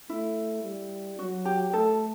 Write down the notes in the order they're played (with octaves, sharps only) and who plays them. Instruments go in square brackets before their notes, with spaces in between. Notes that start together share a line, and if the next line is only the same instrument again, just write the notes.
[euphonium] A3 [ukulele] E4
[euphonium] G3
[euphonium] F#3 [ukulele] F#4
[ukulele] G4
[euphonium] A3 [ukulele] A4